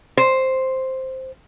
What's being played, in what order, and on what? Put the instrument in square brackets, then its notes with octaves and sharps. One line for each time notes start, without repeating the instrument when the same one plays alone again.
[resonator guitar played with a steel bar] C5